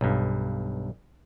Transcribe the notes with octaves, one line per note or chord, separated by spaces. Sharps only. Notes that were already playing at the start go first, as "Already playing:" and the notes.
B1 G2